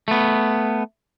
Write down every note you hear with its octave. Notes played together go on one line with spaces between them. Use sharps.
A3 B3